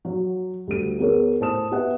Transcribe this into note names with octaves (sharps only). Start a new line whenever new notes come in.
F#3
D2 G3 D#7
B3 G#4 A#4 C#5
A2 C5 A5 D#6 E7
B3 B4 D#5 E5 F#5